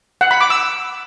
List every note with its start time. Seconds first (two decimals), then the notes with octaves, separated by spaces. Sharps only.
0.21 F#5
0.31 B5
0.41 D6
0.50 E6